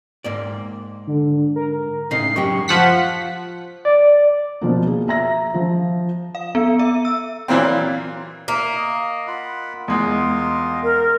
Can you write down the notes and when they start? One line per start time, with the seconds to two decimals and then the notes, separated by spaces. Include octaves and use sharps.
0.24 G#2 A#3 D5
1.07 D3
1.56 A#4
2.11 A2 C#3 D#4 C7
2.36 F#2 G#3 G4 C#6
2.68 F3 F#5 B6
3.85 D5
4.61 B2 F3 A#3
4.87 G#4
5.08 E5 A#5 A#6
5.54 F3
6.35 F5
6.55 B3
6.79 E5
7.05 E6
7.48 A#2 E3 F#3 A#3 C4
8.48 A#3 E5
8.75 D#5
9.27 F4 F#5 B5
9.88 E2 G#3 F4 D#5
10.83 A#4